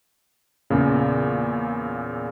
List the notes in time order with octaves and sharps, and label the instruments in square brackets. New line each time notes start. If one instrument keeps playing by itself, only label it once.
[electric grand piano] E2 A#2 C#3